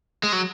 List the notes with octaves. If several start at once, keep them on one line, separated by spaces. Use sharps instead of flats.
G#3
F#3